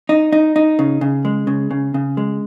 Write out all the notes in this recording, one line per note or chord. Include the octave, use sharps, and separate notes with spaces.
D#4
D#4
D#4
C#3
C#3
G#3
C#3
C#3
C#3
G#3